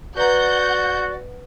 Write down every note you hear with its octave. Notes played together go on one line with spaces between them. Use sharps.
F#4 B4 D5 F#5 A#5 G6